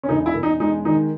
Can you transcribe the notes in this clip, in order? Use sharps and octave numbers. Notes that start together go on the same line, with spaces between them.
C#4
E1 D#4
E4
E1
D#4
G#3 D#4
D#3 D#4